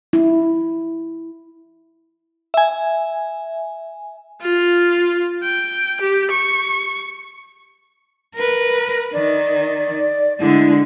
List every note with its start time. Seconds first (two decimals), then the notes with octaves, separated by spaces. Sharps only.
0.13 E4
2.54 E5 G#5
4.42 F4
5.43 G5
6.01 G4
6.31 C#6
8.35 A#4 B4
9.13 D#3 D5
10.40 D3 G#3 E4